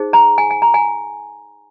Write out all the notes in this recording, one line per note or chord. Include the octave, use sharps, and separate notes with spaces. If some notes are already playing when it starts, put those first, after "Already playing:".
Already playing: D#4 G#4 C5
A#5
G#5
G#5
A#5
G#5